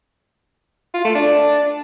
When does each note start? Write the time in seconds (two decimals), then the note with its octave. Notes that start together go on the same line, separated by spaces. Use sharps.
0.94 F4
1.05 A3
1.15 D4